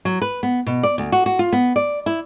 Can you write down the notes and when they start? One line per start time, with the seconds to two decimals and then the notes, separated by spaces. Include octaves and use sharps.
0.05 F#3
0.22 B4
0.43 B3
0.67 B2
0.83 D5
0.98 D2
1.12 F#4
1.26 F#4
1.39 F4
1.53 B3
1.76 D5
2.06 E4